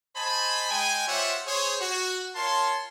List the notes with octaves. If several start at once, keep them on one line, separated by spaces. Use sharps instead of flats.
C5 D#5 G#5 A5 B5
G#3 G5 G#5
F4 G4 C5 C#5 E5 F#5
G#4 C5 C#5
F#4
F4 A#4 C#5 A5 C6